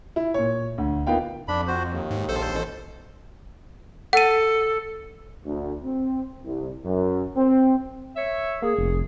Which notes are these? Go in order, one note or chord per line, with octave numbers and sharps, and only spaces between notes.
E4
A#2 C#5
D2
A#3 B3 D#4 F4 F5 G5
F2 D4 B5
F#4 C5
D#2
G#2
A#1 A4 C5
A1 B2
A4 F#5 D#7
D2
C4
C2
F#2
C4
C#5 E5
A#3 G#4
F1